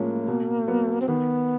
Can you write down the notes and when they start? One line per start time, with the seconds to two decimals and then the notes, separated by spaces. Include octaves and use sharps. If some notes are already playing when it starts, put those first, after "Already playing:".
Already playing: A2 F3 G#3 A#3 C#4
0.28 B2
0.68 F#3 B3
1.01 C4
1.08 D#3 B3